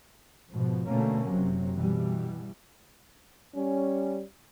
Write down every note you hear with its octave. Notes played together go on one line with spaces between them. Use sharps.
G#2 B2 F3
B2 D3 A3 A#3 C#4
F#1 C3 F#3
B2 E3 G3
G3 C#4